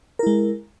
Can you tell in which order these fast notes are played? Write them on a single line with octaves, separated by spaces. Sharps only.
A#4 E4 G#3